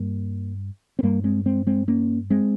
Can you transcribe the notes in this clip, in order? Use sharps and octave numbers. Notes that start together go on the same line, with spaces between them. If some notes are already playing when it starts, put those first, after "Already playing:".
Already playing: G2 G3 A#3
C4
G2 G3 A#3
G#3 C4
G#3 C4
G#3 C4
A#3 C#4
G#3 C4